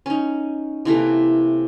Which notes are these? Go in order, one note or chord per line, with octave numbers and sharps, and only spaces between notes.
C#4 D#4
C3 E3 A3 A#3